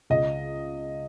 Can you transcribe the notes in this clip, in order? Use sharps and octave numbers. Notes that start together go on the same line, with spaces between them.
C#2 D#5